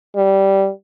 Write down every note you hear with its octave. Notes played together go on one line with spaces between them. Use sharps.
G3